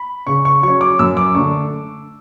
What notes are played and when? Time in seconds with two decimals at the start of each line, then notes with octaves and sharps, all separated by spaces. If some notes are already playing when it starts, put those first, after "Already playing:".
Already playing: B5
0.27 C#3 C#6
0.45 C#6
0.63 F#3 C#4 C#6
0.81 D6
0.99 F#2 E6
1.17 D6
1.35 D3 A3 D4 C#6